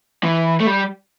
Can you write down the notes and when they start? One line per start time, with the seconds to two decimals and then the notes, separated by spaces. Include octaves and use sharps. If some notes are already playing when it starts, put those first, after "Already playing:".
0.23 E3
0.60 A3
0.67 G3